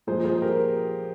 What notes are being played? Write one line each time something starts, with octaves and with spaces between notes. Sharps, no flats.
A#2 F3 G#3 G#4 C5
G#4 C5
G4 A#4